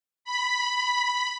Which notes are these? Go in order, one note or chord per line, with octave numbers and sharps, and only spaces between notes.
B5